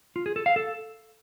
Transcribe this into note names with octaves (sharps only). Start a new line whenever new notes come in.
F4
G#4
A4
F5
A4